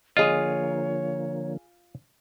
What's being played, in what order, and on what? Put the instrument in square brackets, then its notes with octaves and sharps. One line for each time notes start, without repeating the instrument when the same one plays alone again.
[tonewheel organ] D3 F3 A#3 [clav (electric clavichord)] F4 [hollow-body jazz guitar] G#4 D#5 [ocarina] C#5